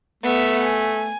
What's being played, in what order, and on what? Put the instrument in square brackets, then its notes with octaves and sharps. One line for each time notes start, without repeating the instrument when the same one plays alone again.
[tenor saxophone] A3 [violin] B3 E5
[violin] G#5